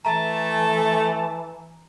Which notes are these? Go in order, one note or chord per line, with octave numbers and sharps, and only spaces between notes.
E3 A3 A5 A#5